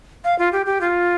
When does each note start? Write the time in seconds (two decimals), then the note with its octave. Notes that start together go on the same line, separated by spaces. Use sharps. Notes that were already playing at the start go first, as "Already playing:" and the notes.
0.24 F5
0.39 F4
0.52 G4
0.66 G4
0.81 F4